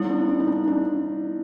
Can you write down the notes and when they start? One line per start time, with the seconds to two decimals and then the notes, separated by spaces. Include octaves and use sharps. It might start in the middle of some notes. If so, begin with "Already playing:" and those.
Already playing: G3 B3 D#4 E4
0.10 D4
0.28 D4
0.40 D#4
0.47 D4
0.68 D4